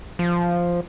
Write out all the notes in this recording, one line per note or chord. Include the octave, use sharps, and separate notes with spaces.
F3